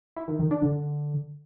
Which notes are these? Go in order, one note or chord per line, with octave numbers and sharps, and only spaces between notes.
E4
D#3
D#3
D4
D3